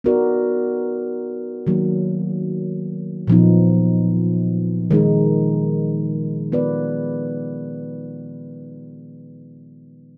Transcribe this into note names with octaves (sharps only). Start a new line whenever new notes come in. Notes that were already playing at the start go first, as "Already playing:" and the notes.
B3 D#4 F#4 A#4 D5
D#3 F#3 A#3
A#2 F3 B3 D#4
D#3 G#3 D#4
B3 F4 B4 D5